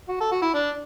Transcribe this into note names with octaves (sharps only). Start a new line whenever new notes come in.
F#4
A4
F#4
E4
D4